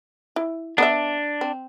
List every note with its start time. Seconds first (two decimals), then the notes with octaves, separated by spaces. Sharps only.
0.36 E4
0.78 B3 D4 B4 E5
1.41 C4